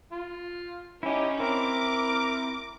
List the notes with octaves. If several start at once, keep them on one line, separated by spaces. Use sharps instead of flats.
F4
C#4 D#4 E4 G4
C4 E4 A#4 D6